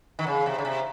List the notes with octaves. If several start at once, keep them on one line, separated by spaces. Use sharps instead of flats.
D#3
C#3
C3
C#3
C3